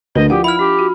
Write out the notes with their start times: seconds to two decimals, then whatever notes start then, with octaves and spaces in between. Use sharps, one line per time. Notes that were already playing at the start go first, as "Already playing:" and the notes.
0.15 D2 A#4 B4 D#5
0.30 F3 E4 F4 G4 F#5
0.44 E4 E5 B5 F6
0.59 D4 G4
0.79 F#4